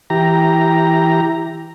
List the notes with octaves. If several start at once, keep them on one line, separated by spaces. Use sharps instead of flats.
E3 G4 A#5